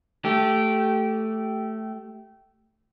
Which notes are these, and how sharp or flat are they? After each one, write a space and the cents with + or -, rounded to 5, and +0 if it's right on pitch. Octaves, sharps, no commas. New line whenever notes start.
A3 +0 G4 -15